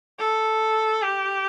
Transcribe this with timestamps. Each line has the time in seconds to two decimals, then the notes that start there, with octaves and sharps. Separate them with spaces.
0.19 A4
1.03 G4